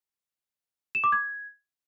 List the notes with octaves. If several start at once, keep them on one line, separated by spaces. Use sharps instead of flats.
E7
D6
G#6